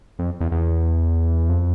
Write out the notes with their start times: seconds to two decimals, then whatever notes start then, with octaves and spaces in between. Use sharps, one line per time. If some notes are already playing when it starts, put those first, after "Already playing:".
0.19 F2
0.40 E2
0.52 E2
1.50 F2